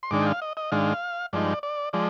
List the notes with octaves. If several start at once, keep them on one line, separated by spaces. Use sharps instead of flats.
C6
G#2 D#3 G#3 D4 D6
G5
F5
D#5
D#5
G#2 D#3 G#3 D4 F5
G2 F3 G#3 D#4 D5
D5
F3 G#3 D5